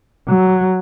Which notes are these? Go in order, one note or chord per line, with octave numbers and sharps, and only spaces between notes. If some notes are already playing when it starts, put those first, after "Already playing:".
F#3